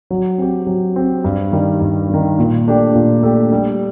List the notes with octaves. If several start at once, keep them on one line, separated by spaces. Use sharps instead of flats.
F#3
C4 G4
F#3
C4 G4
G2
D#3 G3
G2
D#3 G3
A#2
A3 D4 G4
A#2
A3 D4 G4
G3